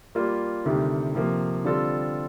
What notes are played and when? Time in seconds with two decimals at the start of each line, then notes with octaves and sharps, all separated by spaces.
0.15 G3 A#3 F4
0.65 D2 C3 D#3 G3
1.15 C3 F3 A#3
1.65 D3 G3 C4 F4 A4